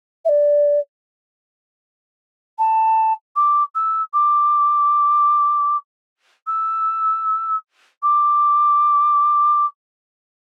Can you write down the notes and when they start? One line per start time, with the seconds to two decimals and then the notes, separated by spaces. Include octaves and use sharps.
0.25 E5
0.29 D5
2.58 A5
3.36 D6
3.75 E6
4.14 D6
6.47 E6
8.03 D6